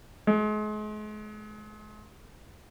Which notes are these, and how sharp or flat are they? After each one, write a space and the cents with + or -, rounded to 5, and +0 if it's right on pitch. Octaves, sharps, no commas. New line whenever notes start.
G#3 +40